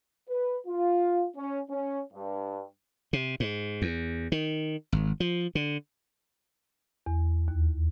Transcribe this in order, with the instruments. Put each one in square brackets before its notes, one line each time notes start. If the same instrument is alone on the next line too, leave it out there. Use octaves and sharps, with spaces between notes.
[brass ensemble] B4
F4
C#4
C#4
G2
[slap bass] C3
G#2
E2
D#3
G#1
F3
D3
[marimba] E2
D#2